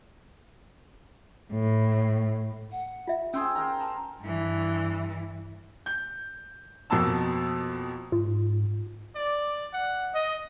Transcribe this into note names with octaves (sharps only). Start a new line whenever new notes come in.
A2
F#5
F4 E5
C#4 G#4 C5 G5 E6
A#4 G5 A#5
A5
G2 E3
G6
F2 B2 A#3 A5 E6
G#2 F4
D5
F#5
D#5